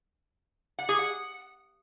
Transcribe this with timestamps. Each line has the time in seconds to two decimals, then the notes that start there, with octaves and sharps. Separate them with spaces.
0.79 F#5
0.89 G#4
0.99 F#5